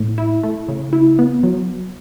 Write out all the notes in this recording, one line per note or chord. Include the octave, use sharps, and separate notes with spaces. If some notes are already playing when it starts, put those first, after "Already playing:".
Already playing: A2
E4
A3
C#3
E4
B3
F#3